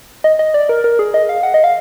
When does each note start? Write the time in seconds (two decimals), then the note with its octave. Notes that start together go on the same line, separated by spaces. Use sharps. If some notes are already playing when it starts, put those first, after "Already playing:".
0.24 D#5
0.39 D#5
0.54 D5
0.69 A#4
0.84 A#4
0.99 G#4
1.14 D#5
1.29 F5
1.43 F#5
1.54 D#5
1.64 F5